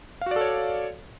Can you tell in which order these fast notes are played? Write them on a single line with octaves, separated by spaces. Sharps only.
F5 F#4 D5 A4 C#5